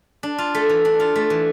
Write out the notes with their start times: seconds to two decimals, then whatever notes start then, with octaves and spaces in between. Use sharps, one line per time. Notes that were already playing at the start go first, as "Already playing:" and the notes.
0.23 D4
0.38 F4
0.55 A3
0.69 E3
0.85 D4
1.00 F4
1.16 A3
1.30 E3